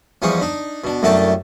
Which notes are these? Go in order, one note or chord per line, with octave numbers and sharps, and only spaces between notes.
E2 F3 G3 G#3 C#6 D#6
D4 D#4
B2 D4
C2 F#2 A3 D4 G5 A5